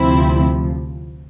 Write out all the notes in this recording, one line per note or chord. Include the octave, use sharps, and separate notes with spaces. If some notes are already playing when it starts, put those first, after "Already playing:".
Already playing: D2 C3 F3 C4 E4